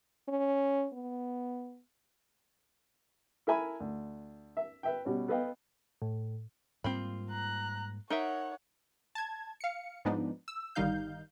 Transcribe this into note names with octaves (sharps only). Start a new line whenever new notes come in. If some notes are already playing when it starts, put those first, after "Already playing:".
C#4
B3
E4 A4 A#4 E5 G#5 B5
D2
E5
B4 E5 G5
B2 G3 C#4
B3 A4 B4 D#5 F5 G5
A2
G#2 G3 A#3 C4 F4 B5
A#5 F#6
D#4 A#4 C#5 E5 F#5
A5 G#6
F5 C#7
G#2 F3 G#3 B3 D4 D#4
E6
G1 D#3 G3 D#4 F5 G6